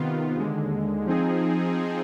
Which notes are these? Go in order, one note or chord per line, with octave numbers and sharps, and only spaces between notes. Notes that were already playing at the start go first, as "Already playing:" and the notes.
Already playing: C3 D#3 B3 F4
D#2 D3 G#3
F3 C4 D#4 G#4